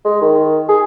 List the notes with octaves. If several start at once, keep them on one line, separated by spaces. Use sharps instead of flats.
G#3
D#3
G#4